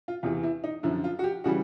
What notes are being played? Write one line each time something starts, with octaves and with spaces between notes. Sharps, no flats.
F4
E2 C3 E3 F4
E4
D#4
F#2 D3 F3 E4
F4
F#4
G4
C#3 E3 G3 F#4